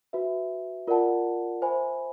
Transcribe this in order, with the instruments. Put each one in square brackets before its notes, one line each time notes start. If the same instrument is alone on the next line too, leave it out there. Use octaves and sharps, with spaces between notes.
[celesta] F#4 B4 E5
F4 A#4 D5 F#5 A5
C5 E5 G#5 B5